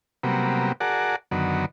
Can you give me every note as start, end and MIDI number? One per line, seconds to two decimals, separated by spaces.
0.23 0.72 48
0.23 0.72 54
0.23 0.72 55
0.23 0.72 58
0.23 0.72 59
0.80 1.16 66
0.80 1.16 68
0.80 1.16 70
0.80 1.16 74
0.80 1.16 78
0.80 1.16 81
1.31 1.66 42
1.31 1.66 50
1.31 1.66 51
1.31 1.66 54
1.31 1.66 59